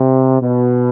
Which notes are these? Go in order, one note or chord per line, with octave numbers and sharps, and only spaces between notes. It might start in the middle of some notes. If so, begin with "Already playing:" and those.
Already playing: C3
B2